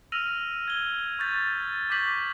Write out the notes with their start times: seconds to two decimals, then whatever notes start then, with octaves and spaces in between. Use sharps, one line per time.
0.12 E6 F6 A#6 D#7 F7
0.68 G#6 G7
1.19 C#6 G6 A6 B6
1.90 C#6 D6 G6 B6 F#7